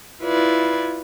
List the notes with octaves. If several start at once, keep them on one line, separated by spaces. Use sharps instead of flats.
E4 F4 B4 D5 G#6